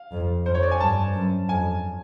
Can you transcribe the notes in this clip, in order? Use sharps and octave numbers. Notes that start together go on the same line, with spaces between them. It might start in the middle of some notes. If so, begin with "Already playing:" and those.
Already playing: F5
F2
F2 C5
C#5
D5
G#5
G2 A5
F#2
F2 G#5